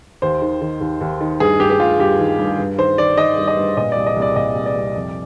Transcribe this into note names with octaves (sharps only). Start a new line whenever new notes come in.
D#2 C5
D#3
D#3
D#2
D#2
D#3
G2 G#4
G2 G4
G4
G2 F4
G2 G4
D#3
G2
G2
D#3 C5
D#3 D5
D#3 D#5
G2
D#5
G2
A#2 D#5
C2 D5
D#5
C2
D5
A#2 D#5
C2
D5
C2
F2